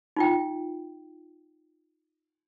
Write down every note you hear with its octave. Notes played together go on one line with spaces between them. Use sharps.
D#4 F4 G5